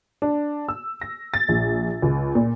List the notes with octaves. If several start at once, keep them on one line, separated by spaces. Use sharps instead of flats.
D4
E6
A#6
A6
A#1
C#2
A#2